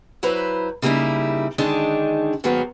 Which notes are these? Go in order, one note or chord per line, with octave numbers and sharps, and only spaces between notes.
F#3 E4 B4 C5 A#5
C#3 G3 A#3 D#4 E4
D3 D#3 G#3 D4 D#4
G#2 D#3 F#3 A#3 B3